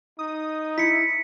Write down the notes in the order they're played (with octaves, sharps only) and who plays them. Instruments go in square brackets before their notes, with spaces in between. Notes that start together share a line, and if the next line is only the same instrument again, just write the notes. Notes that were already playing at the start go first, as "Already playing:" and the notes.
[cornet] D#4 [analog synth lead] D#6
[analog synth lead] E4 [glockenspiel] B6 C#7